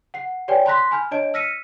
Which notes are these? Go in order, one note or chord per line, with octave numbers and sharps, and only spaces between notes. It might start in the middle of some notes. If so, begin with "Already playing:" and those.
F#5 C7
G4 B4 C#5 D5 G5 G#5
A5 B5 C6 F#6 A#6 B6
G#5 B5 F6 G6
D4 C#5 D#5 A5 D7
E6 F6 A#6 B6 C#7 D#7